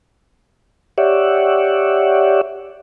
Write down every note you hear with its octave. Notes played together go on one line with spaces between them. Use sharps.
G4 C#5 D5 E5 F#5